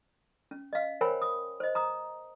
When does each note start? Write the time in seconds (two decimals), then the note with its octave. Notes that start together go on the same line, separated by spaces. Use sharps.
0.51 C#4
0.73 D#5 F5
1.01 A#4 C5 C#5 G5 G#5 B5
1.22 D#6
1.60 C5 D#5
1.75 A#5 D#6